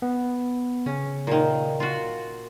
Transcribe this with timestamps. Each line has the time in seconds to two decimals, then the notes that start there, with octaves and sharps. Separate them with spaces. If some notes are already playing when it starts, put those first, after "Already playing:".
0.02 B3
0.86 C#3 C#4
1.27 A#2 D#3
1.80 F4 F#4